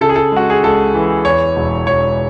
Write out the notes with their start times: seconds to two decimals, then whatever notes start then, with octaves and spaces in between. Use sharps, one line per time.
0.01 C#3 A4
0.09 G#4
0.16 A4
0.32 G#3 F#4
0.50 G#4
0.63 C#2 A4
0.94 E3
1.25 E2 C#5
1.56 E1
1.86 E1 C#5